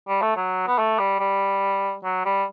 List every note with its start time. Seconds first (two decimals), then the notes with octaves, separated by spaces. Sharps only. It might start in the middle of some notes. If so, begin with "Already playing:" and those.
0.08 G3
0.22 A3
0.36 F#3
0.68 B3
0.78 A3
0.99 G3
1.19 G3
2.04 F#3
2.25 G3